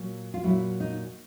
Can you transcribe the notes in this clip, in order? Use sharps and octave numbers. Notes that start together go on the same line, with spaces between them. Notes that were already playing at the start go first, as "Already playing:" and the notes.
Already playing: A#2 F#3
F4
A#2 F#3 E4
D#4